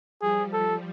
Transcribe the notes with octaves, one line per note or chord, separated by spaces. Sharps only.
F3 G3 G#4
A4